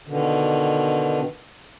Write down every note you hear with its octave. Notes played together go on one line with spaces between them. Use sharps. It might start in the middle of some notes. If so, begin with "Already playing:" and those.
B2 D3 D#3